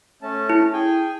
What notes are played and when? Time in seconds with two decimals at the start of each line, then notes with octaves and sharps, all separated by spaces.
0.22 A3 C#4 A5
0.50 E4
0.73 G#4 G5 G#5